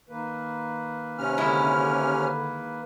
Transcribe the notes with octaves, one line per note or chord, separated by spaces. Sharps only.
D#3 A#3 B4
C3 C#4 F6
D3 G#3 E4